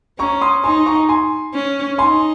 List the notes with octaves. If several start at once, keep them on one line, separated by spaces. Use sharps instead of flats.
C#4 A#5 C#6
C6 D#6
D#4 G#5 C6
A#5 C#6
G#5 C6
C#4
D#4 G#5 C6